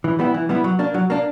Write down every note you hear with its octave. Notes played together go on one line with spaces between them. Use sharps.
E3
G3 B3 E4
E3
G3 B3 E4
F#3
A#3 D4
F#3
A#3 D4